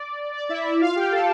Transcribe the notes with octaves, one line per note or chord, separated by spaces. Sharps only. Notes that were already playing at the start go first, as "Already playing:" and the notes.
Already playing: D5
D5
D5
E4 E5
E4 E5
F4 F5
G4 G5
A4 A5